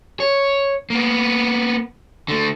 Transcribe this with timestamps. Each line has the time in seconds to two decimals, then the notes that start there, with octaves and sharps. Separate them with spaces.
0.20 C#5
0.90 A#3 B3
2.28 D3 A3